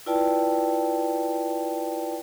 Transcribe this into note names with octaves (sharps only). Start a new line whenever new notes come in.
E4 F4 B4 D5 G5 A5